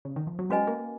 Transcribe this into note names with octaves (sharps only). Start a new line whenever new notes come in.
C#3
D#3
F3
F#3
G#3 C#4 F#4 B4 D#5 G#5
A#3